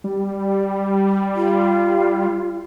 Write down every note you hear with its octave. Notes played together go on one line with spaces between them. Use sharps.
G3
F4